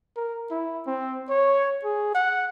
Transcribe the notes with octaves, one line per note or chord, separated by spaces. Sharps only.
A#4
E4
C4
C#5
G#4
F#5